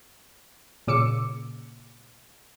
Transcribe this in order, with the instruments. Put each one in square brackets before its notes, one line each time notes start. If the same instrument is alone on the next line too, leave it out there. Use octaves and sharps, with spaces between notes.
[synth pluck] A#2 C#3 D6 E6 C#7